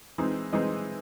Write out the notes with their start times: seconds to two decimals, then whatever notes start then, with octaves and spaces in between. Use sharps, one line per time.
0.18 E3 G#3 C4 D#4
0.52 E3 G#3 C4 D#4 D#5